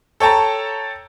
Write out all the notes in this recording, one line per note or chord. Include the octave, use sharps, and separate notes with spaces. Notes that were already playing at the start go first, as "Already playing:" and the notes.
A4 C#5 G5 A5 A#5